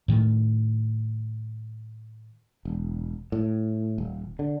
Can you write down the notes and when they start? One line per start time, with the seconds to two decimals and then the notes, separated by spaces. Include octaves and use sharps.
0.08 A2 D#3 A3
2.65 E1
3.32 A2
3.98 D#1
4.39 D3